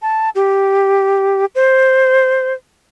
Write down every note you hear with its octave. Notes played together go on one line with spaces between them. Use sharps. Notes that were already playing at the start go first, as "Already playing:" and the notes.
A5
G4
C5